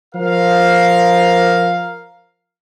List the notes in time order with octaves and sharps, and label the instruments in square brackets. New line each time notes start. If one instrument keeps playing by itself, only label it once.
[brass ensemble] F3 A#4 F5